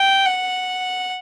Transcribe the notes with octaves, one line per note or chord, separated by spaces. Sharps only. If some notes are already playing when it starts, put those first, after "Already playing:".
Already playing: G5
F#5